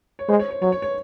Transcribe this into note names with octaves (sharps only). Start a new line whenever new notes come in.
C#5
G#3 C5
C#5
C#5
F#3 C#5
C#5
C#5